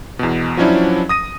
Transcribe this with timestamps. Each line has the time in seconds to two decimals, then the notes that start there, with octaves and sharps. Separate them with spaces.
0.19 E2 B2
0.57 F3 F#3 C#4 D4 E4
1.09 D#6 A#6 D#7